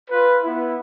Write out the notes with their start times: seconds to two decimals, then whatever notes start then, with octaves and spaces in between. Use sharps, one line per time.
0.10 F4 B4
0.43 B3 E4